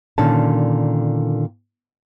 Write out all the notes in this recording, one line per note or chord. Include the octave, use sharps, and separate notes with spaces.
A#2 D3 D#3 C#4 A5